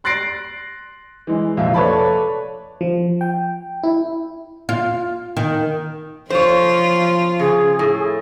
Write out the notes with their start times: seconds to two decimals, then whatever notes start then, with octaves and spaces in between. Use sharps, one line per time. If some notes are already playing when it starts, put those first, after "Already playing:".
0.04 C6 F#6 A6 A#6 C7 D7
1.27 E3 G#3
1.57 A#1 F2 C3 F4 E5
1.74 A4 B4 C#5 D5 A5 B5
2.81 F3
3.21 G5
3.83 E4
4.69 F4
5.37 D#3
6.30 F3 F4 C5 C#5
7.39 C#3 G#4
7.79 A2